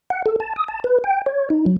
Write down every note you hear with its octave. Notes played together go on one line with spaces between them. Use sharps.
F#5
A4
A5
D#6
A5
B4
G5
C#5
D#4
F#3